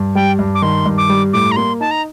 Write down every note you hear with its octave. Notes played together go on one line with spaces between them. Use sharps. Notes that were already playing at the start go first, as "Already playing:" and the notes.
Already playing: G2
G3 G5
G2
D6
D#3 C6
G2
D6
G3
A2 D6
A#5
A#3 C6
D#4 A5
A#5